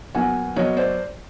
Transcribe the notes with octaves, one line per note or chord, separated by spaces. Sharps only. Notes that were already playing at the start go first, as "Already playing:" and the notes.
B2 F#3 A#3 F#5 G#5
B2 F#3 A#3 C#5 D#5
C5 D5